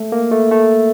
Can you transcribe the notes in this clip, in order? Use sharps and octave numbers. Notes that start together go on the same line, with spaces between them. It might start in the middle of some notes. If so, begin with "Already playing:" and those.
Already playing: A3
A#3
A3
A3